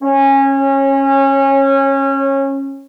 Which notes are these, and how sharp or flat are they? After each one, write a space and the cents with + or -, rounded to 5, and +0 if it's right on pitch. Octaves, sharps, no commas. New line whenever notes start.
C#4 -25